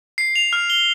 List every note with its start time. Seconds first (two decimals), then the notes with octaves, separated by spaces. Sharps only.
0.18 C7
0.36 F7
0.53 F6
0.70 G7